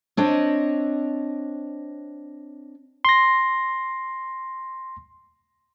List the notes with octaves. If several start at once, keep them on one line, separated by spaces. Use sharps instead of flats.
C4 D4 C#5 D#5
C6 A#6